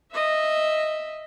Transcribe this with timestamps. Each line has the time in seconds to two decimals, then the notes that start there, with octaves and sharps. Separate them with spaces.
0.12 D#5 E5